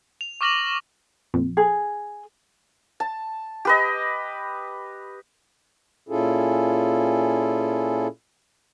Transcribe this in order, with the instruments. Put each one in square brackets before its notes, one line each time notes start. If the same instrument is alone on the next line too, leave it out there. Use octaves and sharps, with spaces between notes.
[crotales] F7
C#6 D6 F6 A#6 E7 F#7
[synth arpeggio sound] A#1 F2
[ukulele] G#4
[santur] A5
G4 B4 D#5
[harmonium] A#2 C#4 E4 F4 G#4 A4